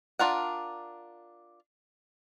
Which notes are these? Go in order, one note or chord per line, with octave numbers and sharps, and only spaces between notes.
D4 F4 A#4 F#5